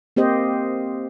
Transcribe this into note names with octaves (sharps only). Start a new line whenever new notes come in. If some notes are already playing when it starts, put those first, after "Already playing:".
A#3 C4 G4 C5 D#5